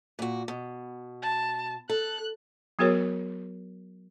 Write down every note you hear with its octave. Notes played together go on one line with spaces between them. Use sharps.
A#2 F#4
B2
A5
A4 F#6
F#3 B3 F#4 G#4 A#4 C#5